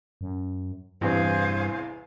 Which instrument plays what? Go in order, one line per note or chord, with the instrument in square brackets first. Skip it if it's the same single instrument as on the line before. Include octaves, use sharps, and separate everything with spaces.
[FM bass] F#2
[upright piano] A1 E2 C3 [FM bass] G2 [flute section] G#4 C5 F5